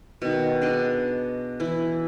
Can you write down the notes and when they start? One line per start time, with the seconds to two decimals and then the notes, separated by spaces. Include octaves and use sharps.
0.22 B2 D#3
0.61 D4 G#4 D5 D#5
1.60 E3 E4